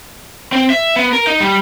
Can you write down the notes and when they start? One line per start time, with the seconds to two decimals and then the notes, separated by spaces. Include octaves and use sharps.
0.52 C4
0.70 E5
0.96 B3
1.13 A#4
1.27 D#4
1.41 G3